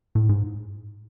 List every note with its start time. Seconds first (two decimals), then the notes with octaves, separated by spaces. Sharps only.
0.15 A2
0.29 G#2